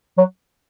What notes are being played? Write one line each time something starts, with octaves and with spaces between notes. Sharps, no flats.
F#3